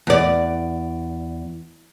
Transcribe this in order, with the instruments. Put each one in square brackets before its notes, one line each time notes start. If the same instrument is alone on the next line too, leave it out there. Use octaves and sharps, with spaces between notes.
[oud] E2 D5